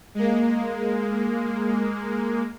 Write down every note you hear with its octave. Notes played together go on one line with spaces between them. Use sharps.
G#3 A#3